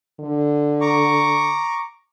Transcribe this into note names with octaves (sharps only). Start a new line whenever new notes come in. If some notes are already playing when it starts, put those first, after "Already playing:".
D3
A#5 C#6 D6